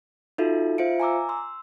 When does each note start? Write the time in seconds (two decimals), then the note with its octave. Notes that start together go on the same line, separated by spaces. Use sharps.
0.38 D#4 F4 F#4 A4 E5
0.78 F4 C5 E5 F5 C#7 D7
1.00 G#5 A#5 D6 E6
1.29 C6 E6